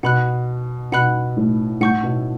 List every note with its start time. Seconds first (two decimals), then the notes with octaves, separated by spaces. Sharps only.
0.03 B2 F#5 B5 F#6
0.92 B2 F#5 B5 F#6
1.37 A2
1.81 A2 F#5 C#6 G6
2.03 B2